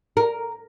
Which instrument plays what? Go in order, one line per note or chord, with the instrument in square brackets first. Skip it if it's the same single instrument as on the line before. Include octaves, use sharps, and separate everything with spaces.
[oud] A#4